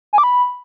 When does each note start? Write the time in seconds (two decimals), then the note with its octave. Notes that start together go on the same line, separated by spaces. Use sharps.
0.13 G#5
0.18 D6
0.23 B5